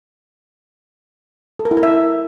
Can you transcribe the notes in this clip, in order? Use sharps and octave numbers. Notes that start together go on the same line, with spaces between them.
A4
A#4
E4
A#4
E5